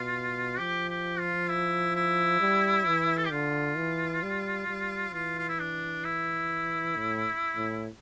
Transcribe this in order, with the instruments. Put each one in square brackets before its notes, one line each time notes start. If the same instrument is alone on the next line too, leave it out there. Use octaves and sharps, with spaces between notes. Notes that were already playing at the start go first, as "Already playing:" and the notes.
Already playing: [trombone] B2 [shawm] F4
[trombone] F3 [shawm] G4
[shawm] G4
F4
E4
E4
[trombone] G3
E3
[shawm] A4
G4
[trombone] D3 [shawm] F4
[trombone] E3
G3
G3
[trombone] E3 [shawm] F4
[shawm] F4
E4
D4
E4
[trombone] A2
A2